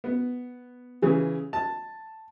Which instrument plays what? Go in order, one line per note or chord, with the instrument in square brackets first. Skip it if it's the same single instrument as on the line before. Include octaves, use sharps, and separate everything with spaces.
[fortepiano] B3
C#3 E3
A5